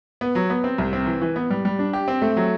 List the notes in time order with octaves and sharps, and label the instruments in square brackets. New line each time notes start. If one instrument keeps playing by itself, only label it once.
[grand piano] B3
F#3
B3
C4
C2
C4
E3
E3
B3
G3
G3
D4
G4
C4
A3
F#3